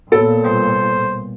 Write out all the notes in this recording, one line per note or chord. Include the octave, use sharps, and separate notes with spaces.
A#2 B3 A4 C#5 E6
B2 G3 C5